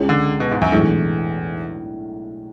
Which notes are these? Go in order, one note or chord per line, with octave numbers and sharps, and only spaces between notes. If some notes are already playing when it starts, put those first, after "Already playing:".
Already playing: C#2 C#3 G#3 C#4
D3
B2
G#2
F#2
B1 E2 A2 G#3 D4 A4